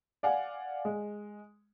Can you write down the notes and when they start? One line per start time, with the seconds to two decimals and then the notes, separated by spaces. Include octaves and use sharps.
0.23 D5 F5 F#5 G#5
0.85 G#3